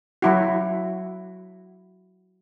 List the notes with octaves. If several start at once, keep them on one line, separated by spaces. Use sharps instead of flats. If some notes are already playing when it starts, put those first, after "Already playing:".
F#3 E4 F#4